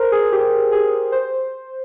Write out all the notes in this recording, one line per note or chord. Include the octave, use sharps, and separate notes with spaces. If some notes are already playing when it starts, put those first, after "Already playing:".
Already playing: A#4 C5
G#4
G4
G#4
C5